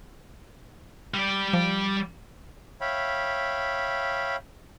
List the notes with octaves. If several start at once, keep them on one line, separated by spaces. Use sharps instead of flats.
G3 D5
F3
C#5 E5 F5 G5 B5